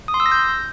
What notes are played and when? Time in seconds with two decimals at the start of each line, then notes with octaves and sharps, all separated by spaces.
0.08 D#6
0.14 C6
0.20 E6
0.26 A#6
0.32 G6